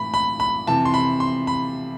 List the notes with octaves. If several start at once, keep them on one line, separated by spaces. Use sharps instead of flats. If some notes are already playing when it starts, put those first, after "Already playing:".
Already playing: A2 E3 A3 B5
B5
B5
F2 C3 E3 A5
C6
B5
C6
B5